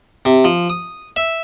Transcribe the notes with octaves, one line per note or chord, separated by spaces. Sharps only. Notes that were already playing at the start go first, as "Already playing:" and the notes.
C3
F3
D#6
E5